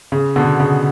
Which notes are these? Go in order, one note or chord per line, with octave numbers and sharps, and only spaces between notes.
C#3
B2 D3
C#3